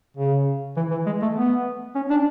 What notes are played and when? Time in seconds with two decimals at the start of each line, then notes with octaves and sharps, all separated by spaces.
0.17 C#3
0.77 E3
0.91 E3
1.06 G#3
1.22 A3
1.37 B3
1.95 C#4
2.10 D4